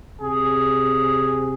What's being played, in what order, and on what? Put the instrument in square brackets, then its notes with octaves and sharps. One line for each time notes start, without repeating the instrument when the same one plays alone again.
[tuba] C3 [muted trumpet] G#4